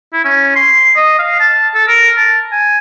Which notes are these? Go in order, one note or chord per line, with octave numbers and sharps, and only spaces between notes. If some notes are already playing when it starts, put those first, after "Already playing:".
E4
C#4
C6
D#5
F5
A5
A4
A#4
A5
G#5